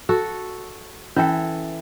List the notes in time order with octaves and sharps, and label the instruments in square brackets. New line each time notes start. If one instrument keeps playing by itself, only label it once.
[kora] F#4 A4
[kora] E3 A4 [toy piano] C#4 E5 G5